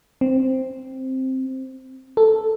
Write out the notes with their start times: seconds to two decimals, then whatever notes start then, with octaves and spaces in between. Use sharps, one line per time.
0.21 C4
2.17 A4